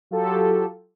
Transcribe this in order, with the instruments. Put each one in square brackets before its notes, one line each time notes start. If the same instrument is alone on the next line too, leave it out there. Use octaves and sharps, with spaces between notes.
[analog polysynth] F#3 F4 G4 A4